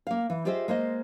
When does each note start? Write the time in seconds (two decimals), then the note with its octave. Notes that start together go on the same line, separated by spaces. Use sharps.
0.07 A#3 F5
0.30 E3
0.45 F4 G4 G#4 C5 D#5 E5
0.68 G#3 A#3 C5 D#5